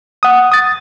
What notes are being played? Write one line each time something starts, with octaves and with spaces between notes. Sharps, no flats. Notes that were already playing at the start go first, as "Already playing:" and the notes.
F#5 D#6
D#6 A6